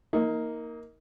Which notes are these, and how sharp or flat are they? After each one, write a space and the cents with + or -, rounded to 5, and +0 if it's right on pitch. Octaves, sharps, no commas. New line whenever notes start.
A#3 +0 D#4 +25